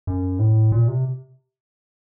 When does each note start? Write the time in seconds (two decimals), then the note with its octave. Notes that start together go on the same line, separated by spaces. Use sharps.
0.07 F#2
0.39 A2
0.72 A#2
0.88 C3